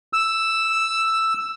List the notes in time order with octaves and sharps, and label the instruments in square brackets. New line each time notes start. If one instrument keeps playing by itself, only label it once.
[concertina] E6